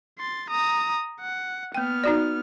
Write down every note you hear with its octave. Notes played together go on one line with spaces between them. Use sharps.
C6 A6
A#5 D#6
F#5
A#3 B3 G5 F6
D#4 F#4 D5